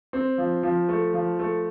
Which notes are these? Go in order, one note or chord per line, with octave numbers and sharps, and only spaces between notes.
C4
F3
F3
A3
F3
A3